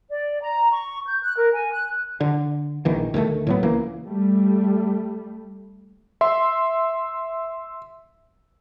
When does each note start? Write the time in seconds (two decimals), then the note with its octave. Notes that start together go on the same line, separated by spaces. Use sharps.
0.10 D5
0.42 A#5
0.72 C#6
1.06 G6
1.22 F#6
1.37 A#4
1.53 G#5
1.73 F#6
2.21 D3
2.85 A#1 D#3 E3
3.14 D2 D#3 F#3 A3
3.47 A2 F#3 B3
3.63 C#2 E3 A#3
4.04 G3 A3
6.21 E5 C6